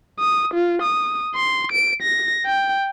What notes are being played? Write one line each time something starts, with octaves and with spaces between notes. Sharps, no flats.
D#6
F4
D#6
C6
D7
A#6
G5